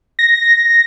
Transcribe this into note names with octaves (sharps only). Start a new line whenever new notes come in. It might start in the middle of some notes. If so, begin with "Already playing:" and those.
A#6